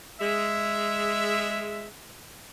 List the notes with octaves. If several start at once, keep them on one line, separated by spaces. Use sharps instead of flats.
G#3 E5